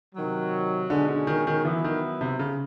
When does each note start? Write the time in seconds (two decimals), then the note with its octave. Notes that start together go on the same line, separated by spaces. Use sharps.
0.15 C3 D#3 F#3
0.90 B2 D3 G#3 C#4
1.08 D3
1.27 D#3
1.47 D#3
1.65 E3 F#3 B3 E4
1.84 D#3
2.21 C3
2.39 C#3